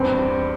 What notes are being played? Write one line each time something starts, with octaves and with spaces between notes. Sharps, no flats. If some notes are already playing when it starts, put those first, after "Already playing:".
Already playing: E2 G2 C4